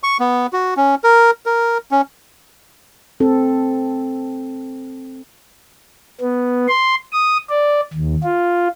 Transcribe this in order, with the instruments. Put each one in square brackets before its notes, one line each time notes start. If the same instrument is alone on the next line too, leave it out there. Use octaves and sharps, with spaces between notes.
[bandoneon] C#6
B3
F#4
C#4
A#4
A#4
C#4
[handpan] C4 A4
[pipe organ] B3
C6
D#6
D5
D#2
F4